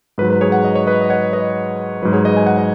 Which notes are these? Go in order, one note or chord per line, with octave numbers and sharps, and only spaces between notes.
G#2 F#3 B4
B4
G#4 C#5
F#5
D#5
C#5
B4 D#5
D#5
C#5 F#5
B4 D#5
G#2 F#3 B4
G#4 C#5
B4 D#5
G#5
F#5
D#5